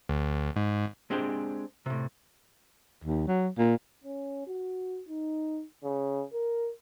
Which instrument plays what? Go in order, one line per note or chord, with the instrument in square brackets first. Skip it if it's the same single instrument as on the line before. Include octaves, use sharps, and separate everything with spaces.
[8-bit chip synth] D2
G#2
[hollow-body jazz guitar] G#3 C4 D4 G4 G#4 C5
A2 C3
[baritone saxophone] D#2
F#3
A#2
[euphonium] C#4
F#4
D#4
C#3
A#4